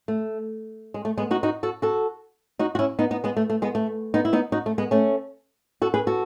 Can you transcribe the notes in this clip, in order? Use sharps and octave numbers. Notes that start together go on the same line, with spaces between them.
A3
G#3
A3
G#3 B3
D#4 F#4
D#4 F#4
F#4 A4
F#4 A4
D#4 F#4
F#4
C#4 E4
B3 D#4
B3 D#4
G#3 B3
A3
A3
G#3 B3
A3
B3 D#4
E4
B3 D#4
D#4 F#4
A3
G#3 B3
A3 C#4
F#4 A4
G#4 B4
F#4 A4